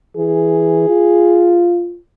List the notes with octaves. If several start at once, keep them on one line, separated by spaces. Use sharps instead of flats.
E3 G#4
F4